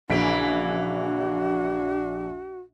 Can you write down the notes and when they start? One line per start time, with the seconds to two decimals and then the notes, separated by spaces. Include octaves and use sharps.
0.10 A#1 C#3 E3 A#3 D4 F#4 B6 D7